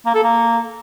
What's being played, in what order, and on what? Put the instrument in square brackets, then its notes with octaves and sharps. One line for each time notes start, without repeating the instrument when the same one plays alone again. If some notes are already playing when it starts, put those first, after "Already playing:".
[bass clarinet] A#3
A4
A#3